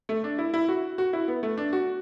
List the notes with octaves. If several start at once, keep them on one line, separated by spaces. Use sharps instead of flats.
A3
D4
E4
E4
F#4
F#4
E4
B3
A3
D4
F#4